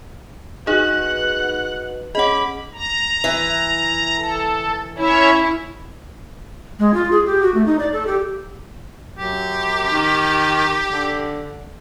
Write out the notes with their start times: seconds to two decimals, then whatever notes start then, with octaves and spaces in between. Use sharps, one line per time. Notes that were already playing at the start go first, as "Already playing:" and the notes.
0.67 D#4 F#4 G#4 B4 D#5 F#5 F#6
2.15 C#4 G#4 D#5 F#5 B5 D6
2.74 A#5
3.24 E3
4.17 A4
4.98 C#4 E4 C#5 E5
6.79 G#3
6.94 F4
7.12 G#4
7.26 G4
7.43 F#4
7.54 A3
7.66 D#4
7.79 D5
7.93 A4
8.07 G4
9.18 F#2 G4
9.91 D#3
10.93 D3